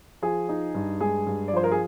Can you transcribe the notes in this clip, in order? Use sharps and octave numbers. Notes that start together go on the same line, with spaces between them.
F3 G#4
D#4
G2
G#3 G#4
G2
D5
F3 C5
A#4
G#4